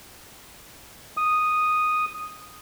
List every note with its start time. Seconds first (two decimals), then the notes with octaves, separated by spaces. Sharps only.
1.17 D#6